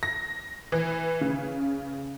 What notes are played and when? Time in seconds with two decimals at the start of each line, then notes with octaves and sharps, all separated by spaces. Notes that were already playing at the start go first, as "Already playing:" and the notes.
0.03 A#6
0.72 E3
1.21 C#3